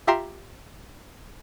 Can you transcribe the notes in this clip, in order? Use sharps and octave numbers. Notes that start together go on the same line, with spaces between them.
F4 G4 E5 G5 A#5 C6